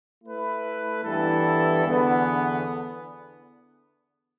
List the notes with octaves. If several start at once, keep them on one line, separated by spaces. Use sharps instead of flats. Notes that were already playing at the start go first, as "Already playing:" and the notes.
A3 E4 B4
G2 E3 B3 E4 A4
E2 D3 B3